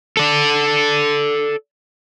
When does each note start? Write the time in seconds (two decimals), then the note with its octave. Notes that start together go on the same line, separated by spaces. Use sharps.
0.17 A4 D5